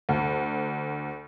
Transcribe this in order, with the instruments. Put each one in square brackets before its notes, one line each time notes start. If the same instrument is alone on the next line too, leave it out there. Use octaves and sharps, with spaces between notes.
[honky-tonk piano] D2